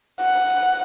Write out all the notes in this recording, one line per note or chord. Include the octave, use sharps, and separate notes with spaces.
F#5